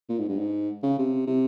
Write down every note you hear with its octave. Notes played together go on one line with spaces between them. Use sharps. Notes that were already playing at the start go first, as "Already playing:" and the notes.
A#2
G#2
G2
G#2
C#3
C3
C3